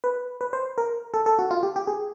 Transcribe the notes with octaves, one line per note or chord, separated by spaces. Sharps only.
B4
B4
C5
A#4
A4
A4
F#4
F4
G4
G4
G#4